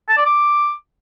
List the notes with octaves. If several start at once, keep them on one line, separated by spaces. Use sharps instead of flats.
A5
D5
D6